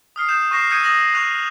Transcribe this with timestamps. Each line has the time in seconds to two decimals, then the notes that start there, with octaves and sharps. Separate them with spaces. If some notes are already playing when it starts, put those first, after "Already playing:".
0.16 D#6 F6 C7
0.29 D#6 G6 E7
0.51 C#6 F#6 A#6 C7 E7
0.70 D#6 E6 G6 G#6 C#7 D#7
0.83 D#6 A#6 E7 F#7
1.14 C#6 E6 F#6 F7